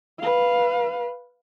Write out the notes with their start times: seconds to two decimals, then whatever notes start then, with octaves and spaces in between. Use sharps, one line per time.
0.20 B4 F5